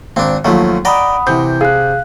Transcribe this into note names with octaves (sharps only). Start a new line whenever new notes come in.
G#1 C4 D4
D#2 F3 F#3 A3
D5 D#5 F#5 G5 A#5 B5 D#6
C3 E3 G6
G#4 F5 F#6